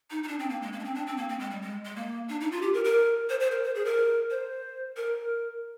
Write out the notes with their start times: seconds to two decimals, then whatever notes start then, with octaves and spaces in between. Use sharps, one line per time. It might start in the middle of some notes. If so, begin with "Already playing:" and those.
0.11 D#4
0.23 D#4
0.28 D4
0.39 C4
0.50 A#3
0.62 G#3
0.73 A#3
0.79 D4
0.84 C4
0.95 D4
1.07 C4
1.17 A#3
1.29 C4
1.40 G#3
1.51 G3
1.62 G#3
1.85 G#3
1.96 A#3
2.29 D4
2.41 D#4
2.52 F4
2.62 G4
2.74 A#4
2.84 A#4
3.29 C5
3.40 C5
3.51 A#4
3.63 C5
3.75 G#4
3.85 A#4
4.30 C5
4.96 A#4